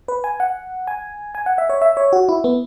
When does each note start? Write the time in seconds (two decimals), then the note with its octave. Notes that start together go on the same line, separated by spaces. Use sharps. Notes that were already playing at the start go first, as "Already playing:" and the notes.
0.08 B4
0.24 G#5
0.40 F#5
0.87 G#5
1.35 G#5
1.46 F#5
1.58 E5
1.70 C#5
1.82 E5
1.97 C#5
2.13 F#4
2.29 E4
2.44 B3